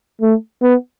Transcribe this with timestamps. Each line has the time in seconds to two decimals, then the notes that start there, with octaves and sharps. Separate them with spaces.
0.22 A3
0.62 B3